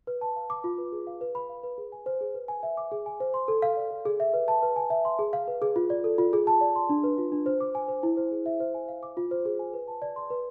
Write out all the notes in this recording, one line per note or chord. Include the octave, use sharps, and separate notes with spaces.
B4
A5
F5
D6
F4
B4
G#4
F5
B4
B5
F5
B4
G#4
G#5
C5
G#4
B4
G#5
E5
D6
G#4
G#5
C5
C6
A4
F5
D5
A4
G#4
E5
B4
A5
B4
G#5
E5
C6
G#4
F5
B4
G#4
F4
D5
A4
F4
G#4
A5
D5
C6
D4
B4
F4
D4
C5
D6
G#5
C5
E4
C5
G#4
E5
C5
G#5
F5
D6
F4
C5
G#4
G#5
B4
A5
D5
C6
B4